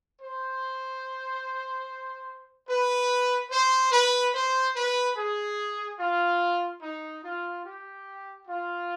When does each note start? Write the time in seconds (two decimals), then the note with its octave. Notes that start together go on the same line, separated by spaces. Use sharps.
0.19 C5
2.67 B4
3.51 C5
3.91 B4
4.33 C5
4.75 B4
5.16 G#4
5.99 F4
6.80 D#4
7.23 F4
7.64 G4
8.47 F4